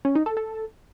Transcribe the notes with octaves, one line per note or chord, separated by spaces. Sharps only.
C#4
D#4
A4
A4